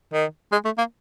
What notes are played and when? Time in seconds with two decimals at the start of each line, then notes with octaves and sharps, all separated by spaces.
0.13 D#3
0.52 G#3
0.65 A3
0.78 A#3